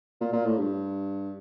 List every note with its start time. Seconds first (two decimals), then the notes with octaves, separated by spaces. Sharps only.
0.21 A#2
0.33 A#2
0.46 A2
0.57 G2